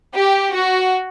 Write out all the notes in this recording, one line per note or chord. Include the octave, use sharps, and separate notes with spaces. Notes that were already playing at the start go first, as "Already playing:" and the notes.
G4
F#4